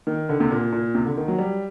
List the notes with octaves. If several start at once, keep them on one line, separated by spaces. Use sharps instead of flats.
D#3
D3
C3
A#2
A#2
C3
D3
D#3
F#3
G3